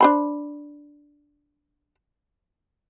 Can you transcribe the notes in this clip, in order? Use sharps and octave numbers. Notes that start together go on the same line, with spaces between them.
D4 C5 B5